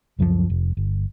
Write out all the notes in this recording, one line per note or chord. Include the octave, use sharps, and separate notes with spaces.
C#2 F#2 E3 F3
F1
G1